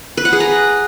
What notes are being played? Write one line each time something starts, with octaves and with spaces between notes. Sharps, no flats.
B4
F#5
G#4
A#5